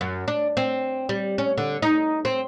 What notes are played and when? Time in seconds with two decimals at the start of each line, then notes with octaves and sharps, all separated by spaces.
0.01 F#2
0.28 D4
0.57 C4
1.09 G3
1.38 C#4
1.58 D3
1.82 D#4
2.25 C4